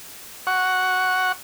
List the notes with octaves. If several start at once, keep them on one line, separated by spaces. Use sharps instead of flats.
F#5 C#6